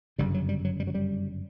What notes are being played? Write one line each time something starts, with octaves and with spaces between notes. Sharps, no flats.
G1 F#2 C#3 G3
F#3
G3
F#3
G3
F#3
G3